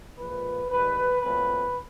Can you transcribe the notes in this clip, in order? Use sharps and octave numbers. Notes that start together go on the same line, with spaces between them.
A#2 F3 G#3 B4
G#2 D#3 G3 B4
A#2 F#3 A3 C4 B4